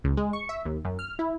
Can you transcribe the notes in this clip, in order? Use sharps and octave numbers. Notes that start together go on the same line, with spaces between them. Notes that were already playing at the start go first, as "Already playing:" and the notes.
C#2
G#3
C#6
E5
D#2
F#2
F6
E4